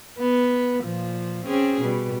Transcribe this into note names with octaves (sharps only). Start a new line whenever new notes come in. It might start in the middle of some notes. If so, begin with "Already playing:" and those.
B3
A#2 F3
C4 C#4 G#4
B2 G3